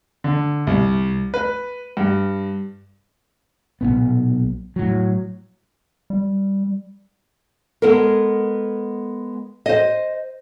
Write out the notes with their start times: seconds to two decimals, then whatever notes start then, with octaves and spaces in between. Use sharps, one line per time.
0.24 D3
0.67 C2
1.34 B4
1.97 G2
3.81 B1 F2 A#2 B3
4.76 A2 F#3
6.10 G3
7.82 G#3 B3 A4 A#4
9.66 C5 D#5